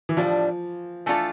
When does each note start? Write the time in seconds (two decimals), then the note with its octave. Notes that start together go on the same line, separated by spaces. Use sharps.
0.09 E3
0.17 A2 F3 G3 D4
1.06 E3 A3 D4 F4 A4